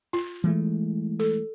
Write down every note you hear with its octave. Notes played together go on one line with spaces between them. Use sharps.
F4
E3 G#3 A3
A4